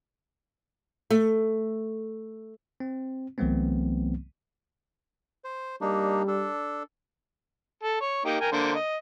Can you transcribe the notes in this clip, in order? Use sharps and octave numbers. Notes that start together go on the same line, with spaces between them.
A3
C4
C2 E3 F#3 A3 B3 C4
C5
G3 A#3 D4 D#4
D4 A4
A4
C#5
A#3 D#4 G4
A#4 G5 G#5
D3 A#3 C5
D#5